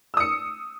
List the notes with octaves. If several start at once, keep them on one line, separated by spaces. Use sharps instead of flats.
D#6 E6 C#7